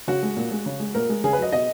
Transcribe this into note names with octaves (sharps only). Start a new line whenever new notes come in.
C#3 F#4
G#3
A#2
G#3
C#3
G#3
A#2 A#4
G#3
C#3 G#4
B4
F#3 D#5
B2 D#5